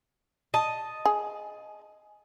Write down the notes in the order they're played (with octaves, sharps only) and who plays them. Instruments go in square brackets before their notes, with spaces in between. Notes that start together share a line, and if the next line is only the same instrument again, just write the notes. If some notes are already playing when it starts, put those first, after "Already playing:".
[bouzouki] D#5 A5
[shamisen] G#4